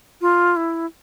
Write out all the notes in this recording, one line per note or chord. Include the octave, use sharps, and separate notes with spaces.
F4
E4